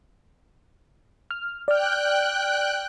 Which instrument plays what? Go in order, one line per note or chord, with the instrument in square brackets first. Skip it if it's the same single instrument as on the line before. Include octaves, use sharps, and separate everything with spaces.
[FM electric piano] F6
[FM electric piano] D5 F6 [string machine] G5 F#6